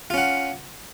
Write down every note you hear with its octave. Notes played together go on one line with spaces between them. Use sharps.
C#4 F4 F#5